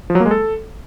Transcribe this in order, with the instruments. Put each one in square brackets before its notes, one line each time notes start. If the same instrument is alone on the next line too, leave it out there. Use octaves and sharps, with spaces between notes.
[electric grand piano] F3
F#3
A#3
G#3
A4